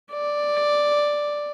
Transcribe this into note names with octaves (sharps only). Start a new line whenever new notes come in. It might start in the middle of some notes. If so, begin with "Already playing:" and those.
D5